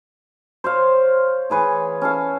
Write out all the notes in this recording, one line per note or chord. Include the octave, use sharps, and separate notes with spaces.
C5 C#5 F5
E3 G#4 B4 C#5
C#4 A4 F5